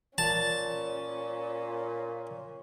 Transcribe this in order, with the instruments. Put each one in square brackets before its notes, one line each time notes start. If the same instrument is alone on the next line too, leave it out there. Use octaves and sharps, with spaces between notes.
[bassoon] A#2 [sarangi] C#4 [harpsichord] A5